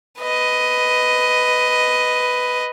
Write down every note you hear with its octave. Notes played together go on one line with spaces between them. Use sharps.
B4 D#5